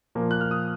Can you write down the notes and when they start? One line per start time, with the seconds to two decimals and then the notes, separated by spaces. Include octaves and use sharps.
0.15 A#2 F3 A#3
0.31 F#6
0.41 F6
0.51 D#6